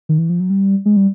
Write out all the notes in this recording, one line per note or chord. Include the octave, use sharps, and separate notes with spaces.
D#3
E3
F3
F#3
G3
G#3
G3